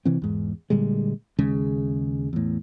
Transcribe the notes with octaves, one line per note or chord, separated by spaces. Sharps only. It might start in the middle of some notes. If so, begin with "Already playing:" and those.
C3 E3 C4
E2 G#2
A#2 D3 G3 G#3
D#2 C#3 G#3
E2 A2